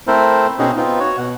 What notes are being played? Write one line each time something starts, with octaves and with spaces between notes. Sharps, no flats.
A3 C4 E4 A4 A#4 C5
B2 C4 C#4 D#4 F#4 G#4
B3 C4 D#4 F4
F#4 C#5
B2 F#5